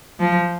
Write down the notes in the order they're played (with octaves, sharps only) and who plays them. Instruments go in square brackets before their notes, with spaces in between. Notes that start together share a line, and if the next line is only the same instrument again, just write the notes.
[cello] F3